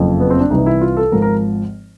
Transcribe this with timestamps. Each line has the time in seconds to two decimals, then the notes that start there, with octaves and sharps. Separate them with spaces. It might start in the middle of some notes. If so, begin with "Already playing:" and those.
Already playing: F#1 F2 C#3 F3
0.20 B3
0.30 C4
0.40 D4
0.50 C2 C3 E3 D#4
0.66 E4
0.81 F4
0.97 A4
1.12 G#1 G#2 F3 A#4
1.22 A#4